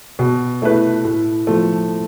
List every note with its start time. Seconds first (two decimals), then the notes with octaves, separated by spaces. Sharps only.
0.19 B2
0.62 A3 E4 B4
1.05 A2
1.47 F3 A3